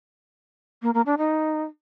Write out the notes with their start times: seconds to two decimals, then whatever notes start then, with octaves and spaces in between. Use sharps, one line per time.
0.82 A#3
0.94 A#3
1.06 D4
1.18 D#4